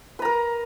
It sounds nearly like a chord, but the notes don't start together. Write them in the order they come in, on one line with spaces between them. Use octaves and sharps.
B4 A#5 A#4